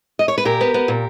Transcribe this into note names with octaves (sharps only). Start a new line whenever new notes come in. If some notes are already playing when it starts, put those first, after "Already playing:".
D#5
C#5
B4
A#2 G4 A#4
B3
B3
A#2